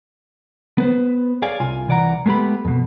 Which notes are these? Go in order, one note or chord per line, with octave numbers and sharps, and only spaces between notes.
B3 B4 C5
G#4 C#5 D5 F5 G#5
C2 F4 G#5
C2 E3 D5 F#5 A#5
G#3 A3 B3 G4 B5
F2 B2